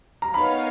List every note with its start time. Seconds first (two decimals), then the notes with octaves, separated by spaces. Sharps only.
0.22 A#5
0.33 B3 D#4 A#4 C#5 F5 B5